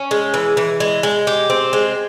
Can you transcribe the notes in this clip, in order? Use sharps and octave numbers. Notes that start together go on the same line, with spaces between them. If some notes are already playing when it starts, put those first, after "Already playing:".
Already playing: C#4
G#3
E3
E3
G#3
G#3
G4
C4
G#3